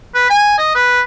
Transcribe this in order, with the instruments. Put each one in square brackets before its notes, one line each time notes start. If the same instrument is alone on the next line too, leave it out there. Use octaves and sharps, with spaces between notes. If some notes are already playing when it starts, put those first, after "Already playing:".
[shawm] B4
G#5
D#5
B4